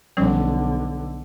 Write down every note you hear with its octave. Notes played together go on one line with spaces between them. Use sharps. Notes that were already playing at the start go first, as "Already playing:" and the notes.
B1 D3 F3 G3 C#4